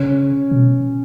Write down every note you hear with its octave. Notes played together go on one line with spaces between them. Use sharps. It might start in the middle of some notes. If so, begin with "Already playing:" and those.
Already playing: C#3 C#4
B2